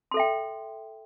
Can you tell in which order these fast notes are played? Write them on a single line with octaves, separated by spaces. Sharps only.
C6 A4 E5 G5